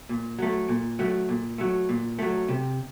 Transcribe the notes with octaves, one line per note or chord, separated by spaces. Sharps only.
A#2
F#3 A3
A#2
F#3 A3
A#2
F#3 A3
A#2
F#3 A3
C3